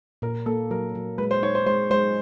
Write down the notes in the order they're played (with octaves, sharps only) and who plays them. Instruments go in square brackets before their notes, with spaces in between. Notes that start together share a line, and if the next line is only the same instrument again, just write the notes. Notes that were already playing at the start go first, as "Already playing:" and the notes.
[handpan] A#2 [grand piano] A#4
[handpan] A#3 [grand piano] A4
[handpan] F#3 [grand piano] A#4
[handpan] F#3
[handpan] G#3 [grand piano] B4
[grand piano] C5
[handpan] D#4 [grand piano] C#5
[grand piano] C5
[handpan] G#3 [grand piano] C5
[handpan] G#3 [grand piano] C5